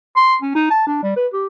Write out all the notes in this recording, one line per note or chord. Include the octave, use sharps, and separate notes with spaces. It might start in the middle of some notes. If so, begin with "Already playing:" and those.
C6
C#4
D#4
A5
D4
G3
B4
G4